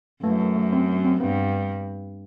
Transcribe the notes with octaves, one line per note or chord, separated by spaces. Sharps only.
F#2 A3
A3
A3
C4
C4
G2 B3